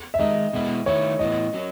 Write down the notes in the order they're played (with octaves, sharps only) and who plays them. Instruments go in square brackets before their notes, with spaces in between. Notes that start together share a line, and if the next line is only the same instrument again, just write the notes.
[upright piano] E5
[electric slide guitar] D#3 G#3 D#4 [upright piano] D#5
[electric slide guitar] B2 G#3 B3 E4
[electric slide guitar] D#3 A3 E4 [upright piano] C#5
[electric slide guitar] A2 E3 B3 [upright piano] D#5
[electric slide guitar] F#3 C#4